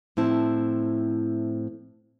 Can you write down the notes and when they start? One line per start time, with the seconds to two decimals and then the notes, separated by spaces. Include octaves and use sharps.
0.17 A2 F3 C4 E4 C5 A5